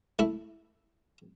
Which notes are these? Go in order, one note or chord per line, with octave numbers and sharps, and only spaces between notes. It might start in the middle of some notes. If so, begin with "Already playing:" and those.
A3 E4